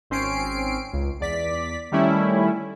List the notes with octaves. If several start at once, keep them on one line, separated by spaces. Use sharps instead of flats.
G#1 C4 C#4 C7 D7
C#2
E2 D5 B6
D#3 G3 A3 C#4 E4